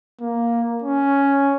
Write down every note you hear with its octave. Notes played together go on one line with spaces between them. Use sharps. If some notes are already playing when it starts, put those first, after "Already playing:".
A#3
C#4